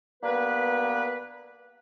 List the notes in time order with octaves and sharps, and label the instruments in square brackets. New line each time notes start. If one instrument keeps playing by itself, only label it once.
[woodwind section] G2 A#3 B3 B4